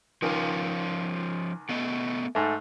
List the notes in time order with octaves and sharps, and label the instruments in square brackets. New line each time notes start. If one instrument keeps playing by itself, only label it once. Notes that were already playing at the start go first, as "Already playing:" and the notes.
[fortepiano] C#2 D#3 [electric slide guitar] F3 C#4 F4
[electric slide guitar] A3 B3 D#5
[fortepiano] G#2 A3